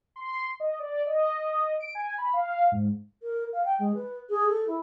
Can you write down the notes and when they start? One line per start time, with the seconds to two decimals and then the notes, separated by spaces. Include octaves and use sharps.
0.16 C6
0.60 D#5
0.79 D5
1.07 D#5
1.80 D7
1.95 G#5
2.18 B5
2.33 F5
2.72 G#2
3.22 A#4
3.53 F5
3.64 G5
3.78 G#3
3.94 B4
4.29 G#4
4.48 A4
4.67 E4